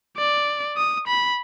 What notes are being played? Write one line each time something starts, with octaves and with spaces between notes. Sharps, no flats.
D5
D#6
B5